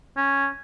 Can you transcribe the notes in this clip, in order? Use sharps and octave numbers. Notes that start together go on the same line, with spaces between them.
C#4